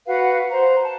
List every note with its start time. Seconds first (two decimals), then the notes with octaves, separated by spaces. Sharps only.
0.07 F#4 B4 F5 F#5
0.50 C5 A#5
0.83 A5